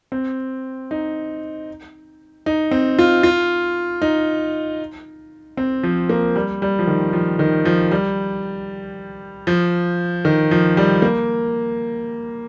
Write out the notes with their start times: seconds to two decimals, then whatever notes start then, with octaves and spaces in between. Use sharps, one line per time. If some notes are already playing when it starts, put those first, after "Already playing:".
0.12 C4
0.91 D#4
2.46 D#4
2.71 C4
2.99 F4
3.23 F4
4.02 D#4
5.57 C4
5.83 F3
6.09 A#3
6.36 G3
6.62 G3
6.79 F3
6.87 D#3
7.13 F3
7.39 D#3
7.65 F3
7.91 G3
9.47 F3
10.25 D#3
10.51 F3
10.77 G3
11.02 A#3